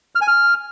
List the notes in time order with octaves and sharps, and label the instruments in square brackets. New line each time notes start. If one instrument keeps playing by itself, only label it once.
[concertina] F6
G#5
F6